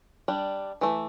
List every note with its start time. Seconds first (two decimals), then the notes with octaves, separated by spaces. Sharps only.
0.28 G3 D4
0.81 E3 A3